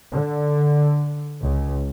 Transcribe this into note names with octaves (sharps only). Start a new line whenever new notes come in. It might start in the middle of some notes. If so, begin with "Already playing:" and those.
D3
C#2